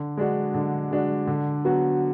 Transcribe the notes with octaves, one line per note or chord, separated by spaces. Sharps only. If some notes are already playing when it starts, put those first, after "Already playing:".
Already playing: D3
G#3 D4 F#4
D3
G#3 D4 F#4
D3
F#3 B3 F#4